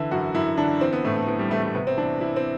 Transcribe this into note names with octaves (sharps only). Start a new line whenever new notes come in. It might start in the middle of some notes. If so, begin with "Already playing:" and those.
Already playing: D3 E3 E4
F#2 F#4
F#2 E4
D3 D4
E3 C4
B3
A2 A3
A3
E3 B3
G3
E3 A3
A3
C3 B3
C4
E3 D4
E3 E4
C4